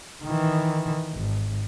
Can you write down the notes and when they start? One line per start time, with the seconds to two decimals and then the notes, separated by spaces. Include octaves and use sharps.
0.24 D#3 E3
1.13 G#1